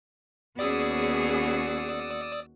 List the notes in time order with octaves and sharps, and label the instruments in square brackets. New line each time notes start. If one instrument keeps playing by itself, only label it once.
[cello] D#2 F#4 [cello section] B3 C#4 G#4 [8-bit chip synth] D5 D#6 E6